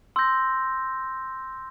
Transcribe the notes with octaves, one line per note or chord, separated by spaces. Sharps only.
C6 E6 G6 A#6